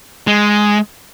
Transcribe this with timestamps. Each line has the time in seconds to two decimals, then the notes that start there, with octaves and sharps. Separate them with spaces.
0.27 G#3